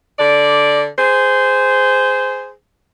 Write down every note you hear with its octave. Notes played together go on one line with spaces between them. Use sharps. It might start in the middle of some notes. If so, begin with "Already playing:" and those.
D3 D5
G#4 C5